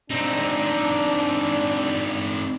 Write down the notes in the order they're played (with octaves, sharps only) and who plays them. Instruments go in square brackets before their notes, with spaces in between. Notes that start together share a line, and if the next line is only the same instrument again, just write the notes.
[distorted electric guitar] C4 D#4 [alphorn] D4